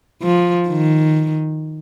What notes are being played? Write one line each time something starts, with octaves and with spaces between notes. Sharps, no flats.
F3
D#3